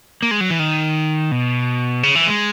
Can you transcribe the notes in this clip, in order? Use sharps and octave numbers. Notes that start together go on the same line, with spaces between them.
A#3
G#3
F#3
E3
D#3
B2
C#3
E3
G#3